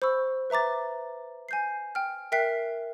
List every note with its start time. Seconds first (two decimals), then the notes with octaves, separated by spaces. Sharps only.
0.02 C5 B5 C#6 E6
0.50 B4 E5 A#5 D6 A6
1.49 G#5 G6 C7
1.95 G5 F6
2.32 A#4 E5 G5 F#6 B6 C7